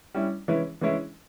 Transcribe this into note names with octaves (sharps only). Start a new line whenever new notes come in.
G3 C#4 E4
E3 G#3 C#4 E4
E3 G#3 C#4 E4